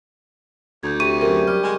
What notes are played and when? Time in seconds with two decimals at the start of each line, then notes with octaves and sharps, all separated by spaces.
0.83 D2 G6 G#6
1.00 C3 C#6 D#7
1.21 F#2 C3 A#4
1.48 G3 F6
1.63 G#3 F6